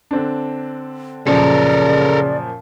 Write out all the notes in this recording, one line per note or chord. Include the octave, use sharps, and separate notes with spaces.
D3 C4 D4
F#2 A#2 C#3 F3 A4 A#4 D5